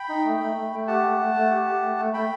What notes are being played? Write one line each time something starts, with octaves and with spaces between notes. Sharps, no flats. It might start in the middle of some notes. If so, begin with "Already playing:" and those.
Already playing: G5 B5
D#4
A3
A3
A3
A3
G4 F#5 A5
A3
A3
A3
G4
G4
A3
A3
A3 G5 B5